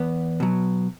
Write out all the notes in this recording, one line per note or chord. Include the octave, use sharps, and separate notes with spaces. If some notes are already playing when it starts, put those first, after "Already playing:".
Already playing: E2 B3
B2 F#3